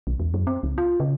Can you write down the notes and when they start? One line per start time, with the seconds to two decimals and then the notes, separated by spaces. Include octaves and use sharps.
0.07 B1
0.20 E2
0.34 F#2
0.47 C4
0.63 C#2
0.78 F4
1.00 C#3